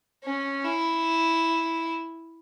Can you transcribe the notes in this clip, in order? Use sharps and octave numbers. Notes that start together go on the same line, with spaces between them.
C#4
E4